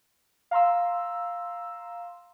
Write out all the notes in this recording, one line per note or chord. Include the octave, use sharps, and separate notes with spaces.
F5 A#5 C6 E6